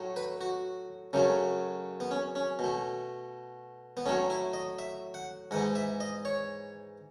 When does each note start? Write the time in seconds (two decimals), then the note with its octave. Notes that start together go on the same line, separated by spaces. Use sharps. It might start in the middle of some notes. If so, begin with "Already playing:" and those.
Already playing: A2 F#3 A3
0.16 B4
0.41 F#4
1.13 F#2 C#3 F#3 A3
2.00 B3
2.11 C#4
2.35 C#4
2.59 B2 A3
3.97 B3
4.06 A2 F#3 A3 C#4
4.30 E4
4.53 D#5
4.79 E5
5.14 F#5
5.51 G#2 E3 G#3 F#5
5.75 E5
6.00 D#5
6.25 C#5